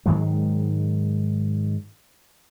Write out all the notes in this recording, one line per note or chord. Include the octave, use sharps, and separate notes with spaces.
G#2 D#3 F#3 G#3